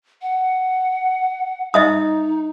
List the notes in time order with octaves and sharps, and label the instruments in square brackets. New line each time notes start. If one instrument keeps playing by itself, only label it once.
[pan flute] F#5
[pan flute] D#4 [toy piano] D#5 E5 D#6